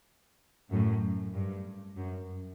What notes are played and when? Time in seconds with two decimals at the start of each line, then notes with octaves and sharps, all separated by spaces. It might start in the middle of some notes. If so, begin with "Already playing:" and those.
0.71 F#2 A2
1.34 G2
1.97 F#2